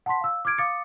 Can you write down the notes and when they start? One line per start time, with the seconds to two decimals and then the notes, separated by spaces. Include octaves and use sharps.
0.06 F#5 A5 B5 C6 B6
0.21 F5 E6
0.45 D6 F6 G#6 D7
0.58 F5 D6 D#6 A6 C#7